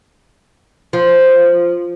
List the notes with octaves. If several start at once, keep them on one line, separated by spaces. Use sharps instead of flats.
F3